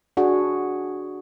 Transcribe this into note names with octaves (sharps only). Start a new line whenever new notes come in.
D4 F#4 G#4